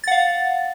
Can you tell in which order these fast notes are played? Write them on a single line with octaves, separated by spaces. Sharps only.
A6 F#5 F5